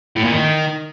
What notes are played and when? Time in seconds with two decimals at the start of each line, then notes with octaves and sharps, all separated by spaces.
0.16 A2
0.24 A#2
0.32 D#3